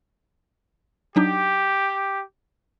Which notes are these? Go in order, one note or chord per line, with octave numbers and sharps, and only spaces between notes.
F#3 D4 D#4 G4